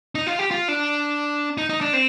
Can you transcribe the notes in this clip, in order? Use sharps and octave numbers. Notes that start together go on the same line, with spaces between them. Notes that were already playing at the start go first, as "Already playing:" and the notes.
D#4
F4
G4
F4
D4
D#4
D#4
D4
C4